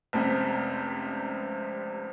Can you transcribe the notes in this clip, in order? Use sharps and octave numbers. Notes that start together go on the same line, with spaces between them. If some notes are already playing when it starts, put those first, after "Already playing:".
F1 C#2 C3